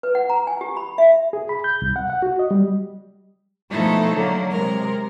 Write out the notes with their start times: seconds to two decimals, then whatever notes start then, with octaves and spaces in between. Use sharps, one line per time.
0.03 B4
0.15 F#5
0.29 A#5
0.47 G#5
0.61 G4
0.77 B5
0.98 E5
1.33 G#4
1.49 B5
1.64 G6
1.82 C2
1.96 F#5
2.10 F#5
2.22 F#4
2.39 D#5
2.51 G3
3.71 B2 F3 A3 D#4 E4 A4
4.12 D3 F#3 A#3
4.50 C3 G#3 A#4